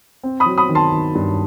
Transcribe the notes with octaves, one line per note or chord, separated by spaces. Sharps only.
C4
B5 D#6
F#3
B5 D#6
D#3
A5 C6
D#3
G2